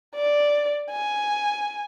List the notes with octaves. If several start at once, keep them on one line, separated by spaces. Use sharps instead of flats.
D5
G#5